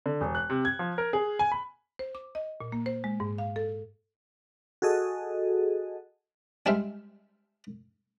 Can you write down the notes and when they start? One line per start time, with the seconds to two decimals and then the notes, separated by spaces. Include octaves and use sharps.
0.06 D3
0.21 E1
0.35 F#6
0.50 C3
0.65 G#6
0.79 F3
0.98 A#4
1.13 G#4
1.39 G#5
1.52 B5
1.99 C5
2.15 D6
2.35 D#5
2.61 A#2
2.72 A#3
2.86 C5
3.04 G#3
3.20 G#2
3.38 F5
3.56 A4
4.82 F#4 G#4 A4 D#5
6.66 G3 G#3 D4 C5 E5 F5